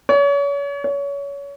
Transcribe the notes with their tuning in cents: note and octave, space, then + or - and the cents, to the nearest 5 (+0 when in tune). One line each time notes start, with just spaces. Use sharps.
C#5 +35
C#5 +25